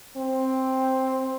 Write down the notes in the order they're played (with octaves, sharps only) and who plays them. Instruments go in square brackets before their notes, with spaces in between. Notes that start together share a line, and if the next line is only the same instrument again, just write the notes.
[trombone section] C4